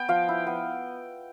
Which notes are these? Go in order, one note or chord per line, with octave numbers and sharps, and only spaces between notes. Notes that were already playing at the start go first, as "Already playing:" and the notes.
Already playing: B3 G5
F3 F5
E4
B3